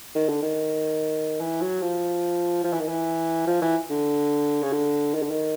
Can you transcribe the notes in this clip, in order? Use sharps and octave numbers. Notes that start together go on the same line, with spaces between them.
D#3
D3
D#3
E3
F#3
F3
F3
E3
D#3
E3
F3
E3
D3
C#3
D3
D#3
D3
D#3